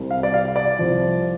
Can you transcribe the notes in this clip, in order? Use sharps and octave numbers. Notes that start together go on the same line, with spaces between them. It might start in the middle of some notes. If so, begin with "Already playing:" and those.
Already playing: C2 C3 G3
F5
D5
F5
D5
C2 C3 F3